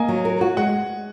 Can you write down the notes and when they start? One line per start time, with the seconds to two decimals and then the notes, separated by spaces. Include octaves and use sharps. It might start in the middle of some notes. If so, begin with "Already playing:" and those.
Already playing: A#3 D#5 G#5 A#5
0.09 F#3
0.25 A#4
0.41 F#4
0.57 G#3 F#5